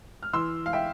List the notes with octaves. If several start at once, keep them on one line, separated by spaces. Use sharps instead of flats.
F6
E3 C6 E6
F5
E5 G5